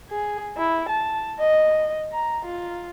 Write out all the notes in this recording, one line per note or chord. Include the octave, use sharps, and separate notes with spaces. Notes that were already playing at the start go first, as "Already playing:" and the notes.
G#4
E4
A5
D#5
A#5
F4